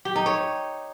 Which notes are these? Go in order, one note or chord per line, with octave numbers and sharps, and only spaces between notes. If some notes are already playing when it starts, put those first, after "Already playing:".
G4
D#4
C#5